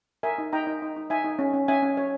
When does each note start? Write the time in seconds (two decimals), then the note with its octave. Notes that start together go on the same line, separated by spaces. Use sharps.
0.23 A#4 E5 G#5
0.38 D#4
0.53 D#4 G5 A#5
0.67 D#4
0.82 D#4
0.96 D#4
1.10 D#4 E5 G#5
1.24 D#4
1.39 C#4
1.54 C#4
1.68 C#4 E5 G#5
1.82 C#4
1.97 C#5